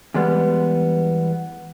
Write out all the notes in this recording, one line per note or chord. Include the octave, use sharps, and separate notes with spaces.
E2 G3 G#3 B3